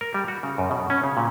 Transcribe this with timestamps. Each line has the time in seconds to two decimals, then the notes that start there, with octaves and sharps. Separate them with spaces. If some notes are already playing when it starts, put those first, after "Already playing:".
0.01 A#4
0.14 G3
0.28 F#4
0.43 C#3
0.58 F#2
0.71 B2
0.90 C#4
1.04 C#3
1.17 A#2